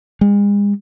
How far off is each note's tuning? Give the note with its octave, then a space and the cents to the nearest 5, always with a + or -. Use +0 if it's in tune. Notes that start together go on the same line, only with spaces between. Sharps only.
G#3 -40